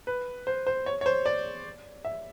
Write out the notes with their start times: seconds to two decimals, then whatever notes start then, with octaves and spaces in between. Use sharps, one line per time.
0.07 B4
0.47 C5
0.67 C5
0.86 C#5
1.01 C#5
1.06 C5
1.26 D5
2.05 E5